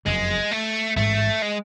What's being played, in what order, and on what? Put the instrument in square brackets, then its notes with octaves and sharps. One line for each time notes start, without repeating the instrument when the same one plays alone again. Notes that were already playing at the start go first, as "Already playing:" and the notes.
[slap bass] F#1 F2 C#3 [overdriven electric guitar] G#3
[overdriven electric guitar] A3
[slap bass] A1 G#2 G#3 [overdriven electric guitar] A3
[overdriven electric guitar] G#3